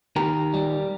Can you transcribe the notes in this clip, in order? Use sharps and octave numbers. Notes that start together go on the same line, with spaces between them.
D#3 G4 A#4
G3